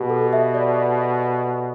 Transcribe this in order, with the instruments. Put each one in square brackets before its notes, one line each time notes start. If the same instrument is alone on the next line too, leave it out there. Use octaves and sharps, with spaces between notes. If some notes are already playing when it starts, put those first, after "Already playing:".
Already playing: [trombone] B2 [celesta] G4
[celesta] A4
E5
D5